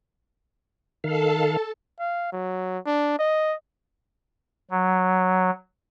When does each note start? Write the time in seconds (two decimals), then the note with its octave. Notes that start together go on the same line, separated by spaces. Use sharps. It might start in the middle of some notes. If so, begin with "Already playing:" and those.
1.04 D#3 A4 F5 A5
2.00 F5
2.33 F#3
2.86 D4
3.19 D#5
4.71 F#3